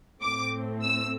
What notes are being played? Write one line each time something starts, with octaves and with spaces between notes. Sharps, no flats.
A2 A3 C4 D6
E6